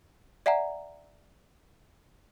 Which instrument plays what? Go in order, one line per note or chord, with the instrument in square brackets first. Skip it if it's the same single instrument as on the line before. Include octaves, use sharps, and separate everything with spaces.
[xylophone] D5 E5 F#5 G#5 A#5